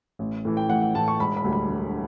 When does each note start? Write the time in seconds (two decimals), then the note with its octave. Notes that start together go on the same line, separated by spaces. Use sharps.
0.19 A1
0.45 A2 E3
0.57 G5
0.69 A1 F#5
0.82 F#5
0.95 A2 E3 A5
1.08 C#6
1.19 E1 B5
1.37 B5
1.44 D2 D3 G3
1.53 B5
1.69 E1